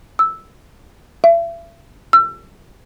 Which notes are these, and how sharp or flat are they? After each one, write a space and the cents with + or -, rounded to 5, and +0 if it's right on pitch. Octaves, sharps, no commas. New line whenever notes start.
E6 -5
E5 +40
E6 +35